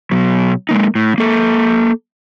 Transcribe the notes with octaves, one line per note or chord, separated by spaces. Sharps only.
B2 F#3
G#3 A#3 D#4
A2
A#3 A4